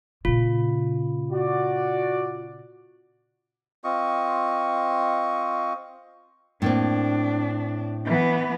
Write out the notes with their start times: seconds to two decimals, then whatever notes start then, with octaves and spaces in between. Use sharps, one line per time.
0.25 A#2 C#3 F4
1.31 F#4 D5
3.84 C4 F4 D#5 C#6
6.62 A2 A#3 C4 D4
8.05 E3 B3